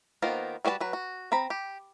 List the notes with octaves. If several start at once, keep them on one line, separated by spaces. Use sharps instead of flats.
D#3 A#3 B3 F4 C5
G3 F#4 B4 D5 A5
F#3 B4
F#4
C4 A#5 B5
G4